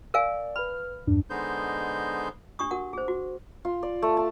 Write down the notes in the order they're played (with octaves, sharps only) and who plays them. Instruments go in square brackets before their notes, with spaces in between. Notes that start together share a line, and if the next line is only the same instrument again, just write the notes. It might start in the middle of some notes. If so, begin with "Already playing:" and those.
[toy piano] A#4 F5 G#5 [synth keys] D5
[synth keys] B4 F6 [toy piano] B5
[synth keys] E2 G2 D4
[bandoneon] D3 G#3 B3 D#4 C5 G6
[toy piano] D4 G4 C#6 D#6
F#4 A#4 F#5
G#4 C5
F#4
[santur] F4
D5
A3
A5